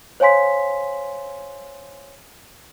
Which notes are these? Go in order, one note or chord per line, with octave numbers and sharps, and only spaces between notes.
C5 C#5 F5 G#5 C6 B6